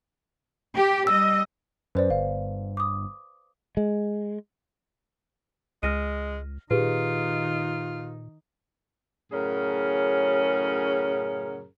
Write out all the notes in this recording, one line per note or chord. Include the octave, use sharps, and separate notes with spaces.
G4
G3 D#5 E6
F#2 B4 C5 D5
G1 F5
D6 D#6
G#3
C#2 G#3 F6 A#6 D#7
A#2 D#3 D#4 F4 G4 G#4 B4
F#2 A2 C#3 C#4 G#4 A#4